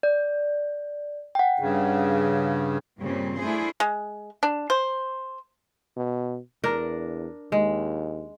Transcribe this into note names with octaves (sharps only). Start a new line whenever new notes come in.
D5
F#5 G5
G2 C#3
G2 A#2 C#3 G3 C4
A3 D4 E4 G#4 C5
G#3
D4
C5
B2
E2 D4 A#4
D#2 G#3